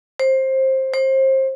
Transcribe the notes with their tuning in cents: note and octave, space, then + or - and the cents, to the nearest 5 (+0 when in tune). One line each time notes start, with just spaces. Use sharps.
C5 +20
C5 +30